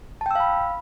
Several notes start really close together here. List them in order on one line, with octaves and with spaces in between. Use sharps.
A5 G5 E6 F5 B5